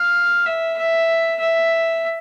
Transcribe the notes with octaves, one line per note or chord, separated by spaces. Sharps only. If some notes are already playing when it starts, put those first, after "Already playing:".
Already playing: F5
E5
E5
E5